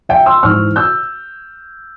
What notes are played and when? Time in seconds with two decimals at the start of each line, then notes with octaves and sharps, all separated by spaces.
0.09 E5 G5
0.26 C6 E6
0.43 G#2 E3 C#6 F6
0.76 E6 G6